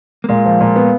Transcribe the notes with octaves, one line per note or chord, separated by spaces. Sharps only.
A#3
A#2 G#3
F3
A#2
B3